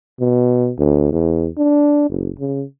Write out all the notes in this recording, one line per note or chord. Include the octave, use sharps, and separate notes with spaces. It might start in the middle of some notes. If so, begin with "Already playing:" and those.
B2
D2
E2
D4
F#1
C#3